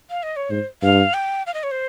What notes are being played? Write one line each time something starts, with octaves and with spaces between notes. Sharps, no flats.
F5
D#5
C#5
G#2 C5
G2 F5
G5
F5
D#5
C#5
C5